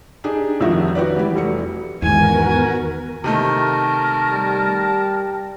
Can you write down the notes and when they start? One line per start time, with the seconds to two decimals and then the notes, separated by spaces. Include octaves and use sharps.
0.24 D4 D#4 G4 G#4
0.60 F2 D#3 F3 G3 F#4 E5
0.95 F#4 G4 B4 D5
1.16 E3 G3
1.35 F1 F#3 C#7
2.02 E2 G#2 D#3 B3 F#4 A#4 G#5
3.24 C3 D#3 A3 A#4 A5
4.31 G3